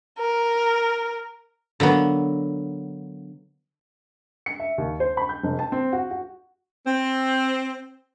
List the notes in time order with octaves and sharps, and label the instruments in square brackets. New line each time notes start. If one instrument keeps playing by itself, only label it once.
[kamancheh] A#4
[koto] D3 F#3 A#3 B3
[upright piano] C#7
E5
D#2
C5
B5
G6
F1
A5
C4
F#4
F#4
[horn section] C4